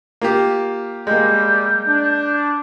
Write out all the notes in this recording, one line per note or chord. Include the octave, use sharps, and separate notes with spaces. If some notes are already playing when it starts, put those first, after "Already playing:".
A#3 F4 G4
G3 G#3 A#3 G6
D4